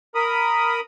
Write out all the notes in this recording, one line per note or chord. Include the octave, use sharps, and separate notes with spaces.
A#4 B5 D#6